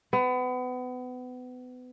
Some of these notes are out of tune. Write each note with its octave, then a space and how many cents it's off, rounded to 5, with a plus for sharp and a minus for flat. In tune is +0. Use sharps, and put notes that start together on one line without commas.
B3 +30